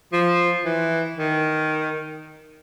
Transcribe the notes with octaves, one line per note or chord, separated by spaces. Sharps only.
F3
E3
D#3